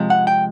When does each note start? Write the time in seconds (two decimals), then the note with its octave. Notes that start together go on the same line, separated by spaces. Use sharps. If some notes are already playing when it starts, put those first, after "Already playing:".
Already playing: C3 F3 G#3
0.10 F#5
0.27 G5